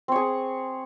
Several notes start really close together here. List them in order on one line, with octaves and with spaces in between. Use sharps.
C4 C#5 G#4